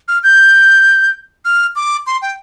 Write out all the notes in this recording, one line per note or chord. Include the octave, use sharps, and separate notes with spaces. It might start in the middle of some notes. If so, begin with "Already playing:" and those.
F6
G6
F6
D6
C6
G5